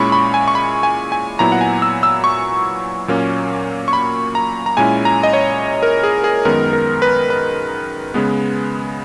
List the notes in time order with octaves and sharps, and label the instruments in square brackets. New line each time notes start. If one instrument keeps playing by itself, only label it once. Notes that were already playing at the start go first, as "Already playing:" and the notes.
Already playing: [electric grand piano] A#2 G#3 C#4 E4 B5 C#6
B5
G#5
C#6
B5
G#5
G#5
A#2 F#3 B3 E4 A#5
F#5
G#5
E6
E6
C#6
A#2 F#3 A#3 C#4
C#6
B5
A#5
A#5
A#2 G#3 C#4 E4 G#5
A#5
D#5
C#5
A#4
G#4
G#4
F#2 D#3 G#3 B3 A#4
A#4
B4
B4
C#3 G#3 B3